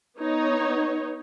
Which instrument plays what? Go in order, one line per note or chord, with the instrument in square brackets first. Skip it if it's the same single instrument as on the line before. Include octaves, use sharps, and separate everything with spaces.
[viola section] B3 D#4 C#5